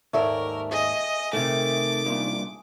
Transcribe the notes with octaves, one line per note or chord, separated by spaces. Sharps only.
D#2 G#2 A3 A#4 D5 E5
G#4 D#5
C3 D#3 A3 D6
C2 G2 A#2